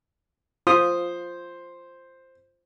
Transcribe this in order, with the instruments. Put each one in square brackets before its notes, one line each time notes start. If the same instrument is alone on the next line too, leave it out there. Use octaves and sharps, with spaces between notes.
[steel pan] F4 D#6 [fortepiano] C5